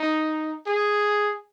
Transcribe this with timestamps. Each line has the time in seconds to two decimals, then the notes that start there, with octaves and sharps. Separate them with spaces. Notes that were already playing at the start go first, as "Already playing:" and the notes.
Already playing: D#4
0.67 G#4